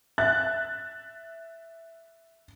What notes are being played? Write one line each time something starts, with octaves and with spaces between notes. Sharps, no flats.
E5 F#6 A6